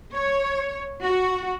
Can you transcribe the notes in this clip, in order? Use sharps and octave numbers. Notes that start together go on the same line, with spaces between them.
C#5
F#4